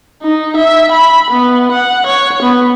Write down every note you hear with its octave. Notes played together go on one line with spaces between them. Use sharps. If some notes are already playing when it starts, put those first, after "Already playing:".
D#4
E5
B5
B3
F#5
C#5
B3